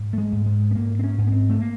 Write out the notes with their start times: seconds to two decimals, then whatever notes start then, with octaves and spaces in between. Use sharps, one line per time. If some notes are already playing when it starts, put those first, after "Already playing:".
Already playing: G#2
0.13 A3
0.18 G#3
0.32 G#2
0.46 G#3
0.71 B3
0.75 G#2 A#3
0.99 C4
1.04 C#4
1.18 G#2
1.27 B3
1.32 C4
1.50 A3
1.61 A#3